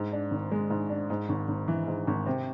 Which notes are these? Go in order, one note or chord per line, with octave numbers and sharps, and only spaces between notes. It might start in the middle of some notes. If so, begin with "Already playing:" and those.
Already playing: G#2
D4
G#1
G#3
G#2
D4
G#2
G#1
G#1
E3
G#2
G#1
C3